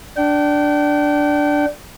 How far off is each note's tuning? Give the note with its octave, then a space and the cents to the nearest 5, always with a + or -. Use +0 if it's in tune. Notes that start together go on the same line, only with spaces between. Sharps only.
D4 +0 G5 -30